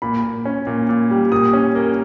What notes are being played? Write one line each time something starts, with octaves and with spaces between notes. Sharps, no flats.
A#2 B5
A#2
C#4
A#2
A#2
G3
A#2 D#6
C#4
A#3